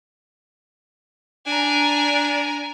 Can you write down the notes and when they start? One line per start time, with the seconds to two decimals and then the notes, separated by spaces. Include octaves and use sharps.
1.47 D4 G#5 A#5